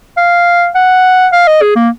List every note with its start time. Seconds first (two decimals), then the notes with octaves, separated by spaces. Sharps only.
0.17 F5
0.75 F#5
1.32 F5
1.47 D#5
1.61 G#4
1.76 A#3